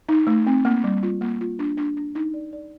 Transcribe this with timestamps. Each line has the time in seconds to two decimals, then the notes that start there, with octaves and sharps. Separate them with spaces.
0.09 D#4
0.27 A3
0.47 C4
0.65 A#3
0.84 G3
1.03 F4
1.21 A#3
1.41 F4
1.59 D4
1.77 D4
1.97 D4
2.15 D#4
2.34 D5
2.53 D5